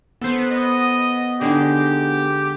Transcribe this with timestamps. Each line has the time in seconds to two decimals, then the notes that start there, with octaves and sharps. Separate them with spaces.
0.22 B3 A4 C5
0.51 D#5
1.41 D3 G#3 D#4 G4